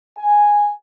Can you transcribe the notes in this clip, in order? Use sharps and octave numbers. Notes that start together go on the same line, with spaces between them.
G#5